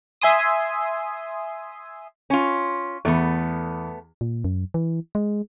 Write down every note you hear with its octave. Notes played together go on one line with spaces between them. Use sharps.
E5 G#5 C6 D#6
C#4 F4
E2 A3 B3
A#2
F#2
E3
G#3